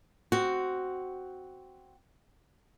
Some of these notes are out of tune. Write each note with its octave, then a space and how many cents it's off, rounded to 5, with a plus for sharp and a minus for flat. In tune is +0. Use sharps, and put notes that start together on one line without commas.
C4 +0 F#4 +10